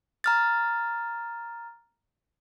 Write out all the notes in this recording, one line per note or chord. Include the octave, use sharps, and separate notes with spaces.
A#5 F6 A6